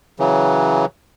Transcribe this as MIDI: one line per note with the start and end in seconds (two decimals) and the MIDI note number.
0.19 0.86 49
0.19 0.86 52
0.19 0.86 54